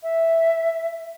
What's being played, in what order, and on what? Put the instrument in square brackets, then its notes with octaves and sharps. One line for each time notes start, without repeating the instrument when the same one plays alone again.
[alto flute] E5